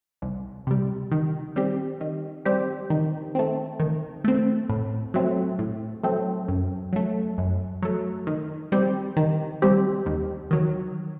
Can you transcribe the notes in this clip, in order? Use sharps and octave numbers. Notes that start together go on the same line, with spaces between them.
C2
C3 G3
D#3
G3 C4 G4
D#3
G3 C4 G4
D#3
A3 C4
D#3
A3 C4
A2
F#3 A3 C4
A2
F#3 A3 C4
F#2
F#3 A3
F#2
F#3 A3
D#3
G3 C4 G4
D#3
G3 C4 G4
D#2
D#3 F#3